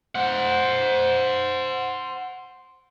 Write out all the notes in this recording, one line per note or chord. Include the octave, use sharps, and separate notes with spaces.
C5 F#5